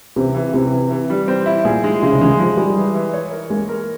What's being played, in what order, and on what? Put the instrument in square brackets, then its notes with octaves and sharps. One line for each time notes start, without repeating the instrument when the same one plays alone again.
[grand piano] C3 [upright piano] E3
[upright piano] E3
[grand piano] C3 [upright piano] E3
[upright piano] E3
E3
G3
C4
E4
[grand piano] A#2 [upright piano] G#4
[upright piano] G#3
[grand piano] C#3 [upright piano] G#3
[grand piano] C#3
[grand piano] E3 [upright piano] G#3
[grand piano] F3 [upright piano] G#3
[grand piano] G3 [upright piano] G#3
[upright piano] E3
E3
C#5
A#4
[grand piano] G#3 [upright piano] A#3
[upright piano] A#4